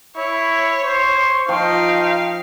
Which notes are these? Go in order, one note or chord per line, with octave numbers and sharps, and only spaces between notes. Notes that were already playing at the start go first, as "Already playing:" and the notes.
E4 C#5
C5 C#6
F3 D#4 F5 G5